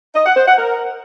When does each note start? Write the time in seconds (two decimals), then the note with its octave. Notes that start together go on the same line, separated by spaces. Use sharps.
0.15 D#5
0.26 F#5
0.36 C5
0.47 F#5
0.58 A#4